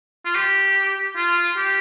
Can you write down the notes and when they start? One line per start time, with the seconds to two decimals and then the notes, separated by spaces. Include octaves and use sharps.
0.25 F4
0.35 G4
1.16 F4
1.57 G4